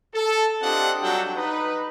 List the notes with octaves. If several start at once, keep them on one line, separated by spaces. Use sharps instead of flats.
A4
C4 D4 F4 G4 D#5 F#5
F#3 G3 D4 F#4 A4 G5
D#4 B4